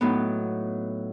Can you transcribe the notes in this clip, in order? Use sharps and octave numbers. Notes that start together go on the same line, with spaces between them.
A2 F#3 B3 D#4